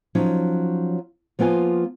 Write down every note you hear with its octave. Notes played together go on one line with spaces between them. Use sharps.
F3 F#3 C#4 D#4
F3 A#3 B3 F4 G#5